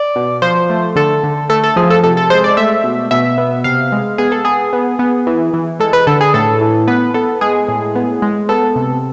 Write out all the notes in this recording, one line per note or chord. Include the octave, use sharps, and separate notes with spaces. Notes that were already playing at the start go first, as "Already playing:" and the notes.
Already playing: D5
B2
F3 C5
A3
D3 A4
D3
A3 A4
A4
F3 G#4
A4
C3 A4
A4
G#3 C5
D5
A3 E5
B2
B2 E5
B3
C3 F5
G#3
B3 G#4
A4
B3 G#4
B3
B3
E3
E3
G#3 A4
B4
D3 A4
G#4
A2 A4
E3
B3 B4
B3 A4
G#3 G#4
A2
B3
G#3
B3 A4
C3